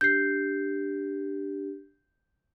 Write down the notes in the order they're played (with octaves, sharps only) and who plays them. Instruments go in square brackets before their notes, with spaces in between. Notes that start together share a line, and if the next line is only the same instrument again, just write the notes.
[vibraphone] D4 G4 [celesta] G6 C7